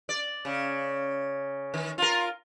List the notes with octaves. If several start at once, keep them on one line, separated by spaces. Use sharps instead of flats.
D5
C#3
D#3
F4 A#4